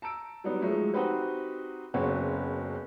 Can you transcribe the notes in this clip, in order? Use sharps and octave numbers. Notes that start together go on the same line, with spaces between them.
A5 A#5 E6 D7
F#3 G3 B3 D4 D#4
F3 F#3 G#3 A3 D#4
C4 D#4 F#4 G4 B4 C5
F#1 C#3 B3 C4 F#4 C#5